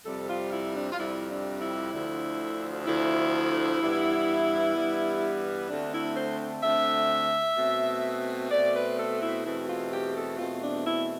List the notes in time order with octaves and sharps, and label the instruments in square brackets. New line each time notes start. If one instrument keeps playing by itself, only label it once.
[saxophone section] F2 C3 G3 C4 A4
F4
E4
D4
F4
F2 C3 G3 C4 E4
D4
E4
D2 D3 F3
D2 D3 F3 E4
G2 E3 G3 B3
G2 E3 G3 B3
D2 D3 A3 C4 D4
E4
C5
D2 D3 A3 C4 E5
B2 A3 C4
B2 A3 C4 D5
B4
A4
E4
E2 B2 A3 C4 E4
F4
G4
A4
E2 B2 A3 C4 F4
D4
E4